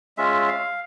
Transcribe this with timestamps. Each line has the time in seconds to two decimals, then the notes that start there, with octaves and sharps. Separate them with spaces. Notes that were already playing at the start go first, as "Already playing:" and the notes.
0.18 G#3 C#4 F4 E5
0.48 F5